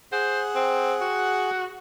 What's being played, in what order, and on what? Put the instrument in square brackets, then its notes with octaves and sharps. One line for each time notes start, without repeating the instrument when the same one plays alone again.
[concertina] G#4 F#5 [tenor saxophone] C5
[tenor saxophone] C4
F#4